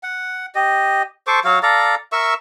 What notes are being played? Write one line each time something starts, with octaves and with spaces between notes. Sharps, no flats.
F#5
G4 D#5
A4 C5 C#6 D6
F#3 F#4 F5
A4 D5 F5 A#5
A#4 E5 C#6 E6